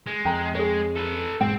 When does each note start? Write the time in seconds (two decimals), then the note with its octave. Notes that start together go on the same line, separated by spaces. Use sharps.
0.07 G#3
0.25 F2 G5 A#5
0.55 G#3 G#4 C#5
0.96 A4 B4
1.41 E1 G#2 G#3 C4 G5